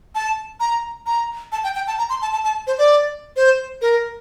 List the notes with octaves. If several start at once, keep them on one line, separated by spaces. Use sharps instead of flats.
A5
A#5
A#5
A5
G5
G5
A5
A#5
C6
A5
A5
A5
C5
D5
C5
A#4